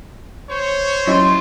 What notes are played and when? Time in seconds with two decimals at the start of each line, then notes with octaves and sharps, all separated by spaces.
0.49 C5 C#5
1.07 F#3 C#4 E4 D#5 C6